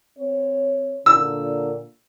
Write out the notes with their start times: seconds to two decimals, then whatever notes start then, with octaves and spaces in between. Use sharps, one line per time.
0.18 C4 C#5
1.06 A#2 D3 E6